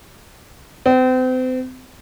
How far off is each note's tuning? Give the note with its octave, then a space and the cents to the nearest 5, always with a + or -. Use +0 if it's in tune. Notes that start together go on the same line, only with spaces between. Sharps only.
C4 -35